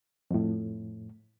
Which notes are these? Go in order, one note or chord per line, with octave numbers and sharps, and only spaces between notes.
F2 A2